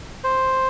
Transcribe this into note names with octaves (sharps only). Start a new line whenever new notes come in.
C5